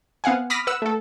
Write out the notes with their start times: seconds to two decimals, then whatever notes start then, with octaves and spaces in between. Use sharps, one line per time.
0.24 B3 C4 F5 F#5 G#5
0.50 B5 D6 D#6 F6 A#6 B6
0.67 B4 F#5 E6
0.82 A3 A4